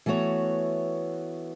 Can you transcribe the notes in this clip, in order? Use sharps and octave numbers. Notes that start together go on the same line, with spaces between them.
E3 A3 B3 F#4 C#5